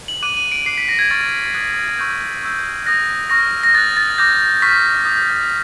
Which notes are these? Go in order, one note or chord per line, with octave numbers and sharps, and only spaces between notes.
F#7
D6 F#6 D#7
D#7
D7
D6 F#6 C7
B6
A#6
G#6
C#6 F6 A6
D#6 F#6
C#6 E6 G6
C#6 E6 G6
D#6 F#6 A#6
C#6 F6 A#6
A#6
D#6 F#6 A6
A6
D6 G6 A#6
C#6 F6 B6
D#6 G6